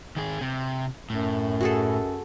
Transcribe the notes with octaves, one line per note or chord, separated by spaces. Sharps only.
D#3 G#4
C3
F#2 A2
F#4 G#4 A4